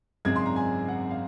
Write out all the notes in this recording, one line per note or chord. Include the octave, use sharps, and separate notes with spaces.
G#1 F#2 C#3 G#3 C4 G#6
C6
A#5
G#5
F#5
F5